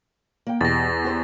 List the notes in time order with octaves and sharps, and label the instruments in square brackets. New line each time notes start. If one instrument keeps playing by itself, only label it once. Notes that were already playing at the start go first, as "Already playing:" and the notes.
[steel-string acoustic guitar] A#3 G5
[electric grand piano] E2 [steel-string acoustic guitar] B2 G4 [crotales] A6 A#6
[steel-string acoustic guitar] G4 C5